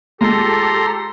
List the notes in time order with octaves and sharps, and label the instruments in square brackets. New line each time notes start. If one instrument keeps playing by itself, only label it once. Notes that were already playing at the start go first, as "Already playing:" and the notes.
[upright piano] A#2 G#3 [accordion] G4 A4 [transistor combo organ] A#5 C6